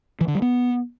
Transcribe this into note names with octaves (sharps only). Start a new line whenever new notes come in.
E3
D3
G3
B3